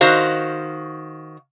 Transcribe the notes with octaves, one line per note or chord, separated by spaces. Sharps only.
D#3 F#4 C5 F5